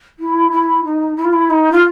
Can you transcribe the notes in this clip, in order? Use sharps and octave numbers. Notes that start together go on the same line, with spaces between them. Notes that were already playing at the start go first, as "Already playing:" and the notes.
E4
E4
D#4
E4
F4
E4
D#4
F4